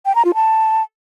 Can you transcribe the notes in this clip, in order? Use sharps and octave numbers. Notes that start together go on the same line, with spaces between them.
G5
A#5
F4
A5